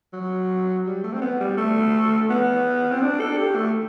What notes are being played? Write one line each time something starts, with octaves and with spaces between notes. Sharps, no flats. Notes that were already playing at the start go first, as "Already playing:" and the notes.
F#3
G3
A3
C4
B3
G3
A3
B3
C4
D4
A4
G4
A3